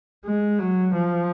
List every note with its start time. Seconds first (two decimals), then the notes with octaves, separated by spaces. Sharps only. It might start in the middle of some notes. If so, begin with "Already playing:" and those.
0.25 G#3
0.59 F#3
0.94 F3